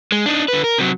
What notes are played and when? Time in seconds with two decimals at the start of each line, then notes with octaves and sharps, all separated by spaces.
0.12 G#3
0.26 D4 D#4
0.48 D3 B4
0.64 A#4
0.78 C3 F#3